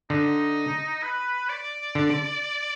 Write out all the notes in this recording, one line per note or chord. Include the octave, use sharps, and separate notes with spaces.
D3 D#4
B4
D5
D3